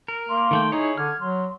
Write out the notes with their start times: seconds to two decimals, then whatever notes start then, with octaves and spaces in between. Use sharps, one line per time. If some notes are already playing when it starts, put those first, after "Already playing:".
0.08 A#4
0.29 A#3 C6
0.51 D#3 A3 G5
0.72 D#4 E4 G#4 C#5
0.98 D3 F6 G#6
1.20 F#3 C6